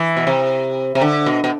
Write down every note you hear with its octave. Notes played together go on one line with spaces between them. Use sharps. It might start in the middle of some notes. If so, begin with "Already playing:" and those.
Already playing: E3
B2
C3
C3
D3
B2
B2